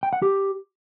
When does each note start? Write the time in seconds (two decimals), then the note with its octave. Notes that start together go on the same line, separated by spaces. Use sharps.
0.03 G5
0.13 F#5
0.22 G4